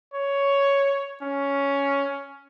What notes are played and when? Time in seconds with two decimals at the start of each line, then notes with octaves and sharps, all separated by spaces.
0.14 C#5
1.22 C#4